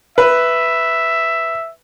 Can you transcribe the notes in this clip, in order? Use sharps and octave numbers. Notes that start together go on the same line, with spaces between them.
B4 E5